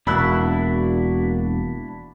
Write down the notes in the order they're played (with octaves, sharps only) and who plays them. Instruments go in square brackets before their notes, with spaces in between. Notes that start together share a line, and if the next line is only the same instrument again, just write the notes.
[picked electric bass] E1 [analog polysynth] A#3 F#4 [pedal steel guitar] D4 E4 [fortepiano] B5 E6 F#6